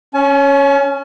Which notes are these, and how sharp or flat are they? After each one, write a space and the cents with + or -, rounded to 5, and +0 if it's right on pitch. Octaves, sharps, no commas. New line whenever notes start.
C#4 +0 G#5 +40